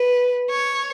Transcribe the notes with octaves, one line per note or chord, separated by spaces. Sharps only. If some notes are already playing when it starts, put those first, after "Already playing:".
Already playing: B4
C#5